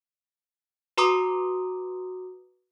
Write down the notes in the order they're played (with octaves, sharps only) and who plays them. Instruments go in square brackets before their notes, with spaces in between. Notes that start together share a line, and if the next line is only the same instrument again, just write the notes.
[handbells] F#4 B4 A#5 C6 D6 D#6